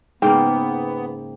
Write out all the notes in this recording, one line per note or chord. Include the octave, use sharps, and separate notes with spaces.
G#2 C#3 A#3 B3 G5